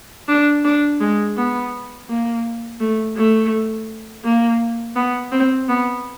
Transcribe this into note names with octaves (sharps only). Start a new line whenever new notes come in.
D4
D4
G#3
B3
A#3
A3
A3
A#3
B3
C4
B3